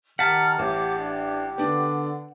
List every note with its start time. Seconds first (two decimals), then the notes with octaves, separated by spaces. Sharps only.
0.19 D#3 G4 F#5 A5 A#5 F6 B6
0.59 A1 G4 C#5 D6
0.99 D4 G4
1.58 D3 B3 D4